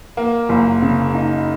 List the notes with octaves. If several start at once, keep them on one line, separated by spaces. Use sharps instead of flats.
A#3
F#1
C#3
D#4